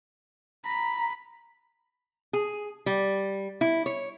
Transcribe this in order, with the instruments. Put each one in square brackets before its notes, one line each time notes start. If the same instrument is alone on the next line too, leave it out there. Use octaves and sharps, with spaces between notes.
[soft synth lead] A#5 [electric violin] B5
[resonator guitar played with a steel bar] G#4
G3
E4
C#5